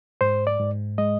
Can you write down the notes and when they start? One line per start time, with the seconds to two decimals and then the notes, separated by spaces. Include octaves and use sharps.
0.21 G#2 C5
0.47 D5
0.60 G#2
0.98 G#3 D#5